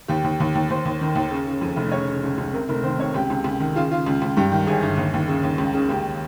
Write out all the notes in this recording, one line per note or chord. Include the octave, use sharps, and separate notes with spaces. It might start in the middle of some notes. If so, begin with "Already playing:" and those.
D#2 G4
D#2
D#2
D#2
D#2 C5
D#2
D#3
D#2
C#3
C#3
F2
F1
C#3 C#5
C#3
C#2
C#2
C3 A#4
F1 A#4
D#3 C5
C3 C#5
C#2 G4
C#2
C#2
D#3
C#3 F4
C#3 F4
C#2
C#2
G2 G4
D#3
G1 G#4
G1
D#2
D#2
C#3
D#2
C#2
C#3
C#2 G4